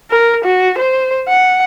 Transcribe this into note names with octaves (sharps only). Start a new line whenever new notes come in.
A#4
F#4
C5
F#5